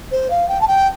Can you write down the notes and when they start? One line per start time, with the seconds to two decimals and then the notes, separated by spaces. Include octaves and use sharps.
0.12 C5
0.30 F5
0.48 G5
0.61 A5
0.68 G5